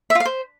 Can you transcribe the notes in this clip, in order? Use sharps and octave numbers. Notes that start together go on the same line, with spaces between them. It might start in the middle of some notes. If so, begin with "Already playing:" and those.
E5
F4
F5
C5